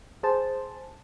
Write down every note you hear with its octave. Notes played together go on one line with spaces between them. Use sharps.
G#4 C5 A5